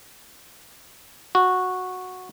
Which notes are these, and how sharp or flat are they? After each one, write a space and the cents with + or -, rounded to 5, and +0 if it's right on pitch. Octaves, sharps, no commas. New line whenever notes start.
F#4 -10